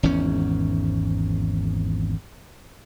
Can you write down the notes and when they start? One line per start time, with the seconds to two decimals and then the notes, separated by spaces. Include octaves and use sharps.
0.03 G#1 E2 G#2 C#4